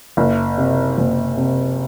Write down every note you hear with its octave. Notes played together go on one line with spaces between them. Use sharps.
F#1
C3
F#1
C3